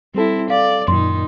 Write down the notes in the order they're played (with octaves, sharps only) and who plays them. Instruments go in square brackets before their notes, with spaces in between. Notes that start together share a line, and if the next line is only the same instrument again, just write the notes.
[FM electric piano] G3 A4 [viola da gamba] C4 E4
[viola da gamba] D5 [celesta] F5
[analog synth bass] F#2 [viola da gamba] A#2 D#3 D#4 [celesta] C6